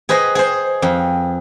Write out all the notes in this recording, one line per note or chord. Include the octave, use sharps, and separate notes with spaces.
G#4 B4 C5 D#5
G#4 C5
F2